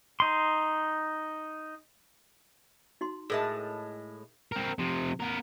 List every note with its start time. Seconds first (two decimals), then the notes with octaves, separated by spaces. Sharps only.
0.20 D#4 C6
3.01 D#4 F#4 C6
3.30 A2 G#3 G#4 A#4 E5 A5
4.52 C4 A#4
4.79 C3 F3
5.20 B3 A#4